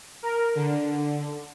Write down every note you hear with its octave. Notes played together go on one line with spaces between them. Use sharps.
A#4
D3